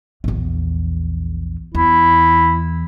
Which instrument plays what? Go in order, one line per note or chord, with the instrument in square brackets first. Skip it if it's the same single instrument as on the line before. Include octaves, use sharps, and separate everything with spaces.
[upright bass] A#1 E2
[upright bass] E2 [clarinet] E4